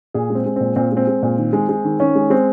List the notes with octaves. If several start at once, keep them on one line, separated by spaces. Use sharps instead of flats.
A#2 G#4
G#3 C4
G#3
A#2 C4
A#2 C4
G#3 C4
G#3
A#2
D#3
G#3
G#3
D#3
D#3 C#4
G#3
G#3 C4